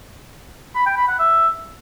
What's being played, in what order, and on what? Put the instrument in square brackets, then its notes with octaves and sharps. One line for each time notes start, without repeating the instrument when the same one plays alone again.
[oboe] B5
G5
B5
F#5
E5